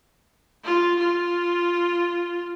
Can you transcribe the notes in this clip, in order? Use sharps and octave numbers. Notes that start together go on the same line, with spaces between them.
F4
F4